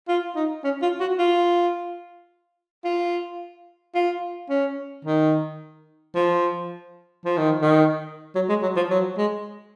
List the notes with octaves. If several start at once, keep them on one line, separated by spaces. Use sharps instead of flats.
F4
D#4
C#4
F4
F#4
F4
F4
F4
C#4
D#3
F3
F3
D#3
D#3
F#3
G#3
F#3
F3
F#3
G#3